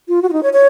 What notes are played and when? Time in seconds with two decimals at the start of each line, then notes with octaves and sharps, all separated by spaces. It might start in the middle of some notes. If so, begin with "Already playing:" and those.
0.08 F4
0.22 F#4
0.29 F4
0.33 D#4
0.43 C#5
0.53 C#5